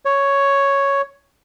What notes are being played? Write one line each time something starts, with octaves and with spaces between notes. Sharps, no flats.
C#5